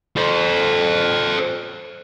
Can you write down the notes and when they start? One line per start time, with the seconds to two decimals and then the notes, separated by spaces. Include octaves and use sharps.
0.17 A4 C5